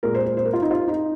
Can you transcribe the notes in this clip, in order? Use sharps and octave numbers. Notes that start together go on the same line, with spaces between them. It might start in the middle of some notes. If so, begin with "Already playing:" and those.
A#2 G#3 A#4
C5
C5
C5
A#4
F4
D#4
F4
D#4